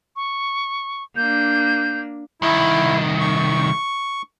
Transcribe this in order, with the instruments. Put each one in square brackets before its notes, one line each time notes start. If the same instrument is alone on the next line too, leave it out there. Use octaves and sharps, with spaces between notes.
[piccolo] C#6
[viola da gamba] A#3 D4 [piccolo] G6
[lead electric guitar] C2 D#3 [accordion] E4
[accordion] C#6